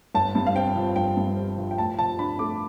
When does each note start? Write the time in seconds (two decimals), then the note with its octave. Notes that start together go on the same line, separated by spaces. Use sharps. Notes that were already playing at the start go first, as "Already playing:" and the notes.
0.15 G1 A5
0.35 G2
0.47 F5
0.56 C4 G5
0.76 F3
0.96 G1 G5
1.17 G2
1.37 C4
1.58 F3
1.71 G5
1.78 A2 A5
1.99 F3 A5
2.19 D4 B5
2.39 A3 D6